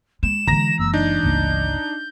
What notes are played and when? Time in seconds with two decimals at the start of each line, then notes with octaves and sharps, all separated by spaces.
0.23 G#3 E7
0.47 D3 E3 G#3 A#5 A#6
0.79 F#1 A#3 E6
0.93 D4 D#4 G6
1.23 G1 C#2 A#3